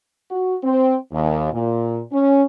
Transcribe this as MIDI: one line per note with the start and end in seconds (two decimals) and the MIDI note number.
0.30 0.55 66
0.63 0.97 60
1.12 1.50 39
1.52 2.00 46
2.12 2.44 61